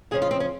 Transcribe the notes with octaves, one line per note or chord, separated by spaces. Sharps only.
F2 C#3 F3 G#4
F4
C4
C#4